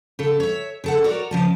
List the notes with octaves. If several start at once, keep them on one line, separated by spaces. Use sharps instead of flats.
C#3 A4
C#5 E5
C#3 A4 F#5
F#4 A#4 C#5 D5
C#3 F3 A5